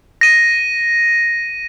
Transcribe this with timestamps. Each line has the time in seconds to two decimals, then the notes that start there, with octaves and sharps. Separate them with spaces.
0.21 A#6 D#7